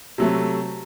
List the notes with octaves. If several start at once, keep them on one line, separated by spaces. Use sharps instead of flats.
C3 F#3 A3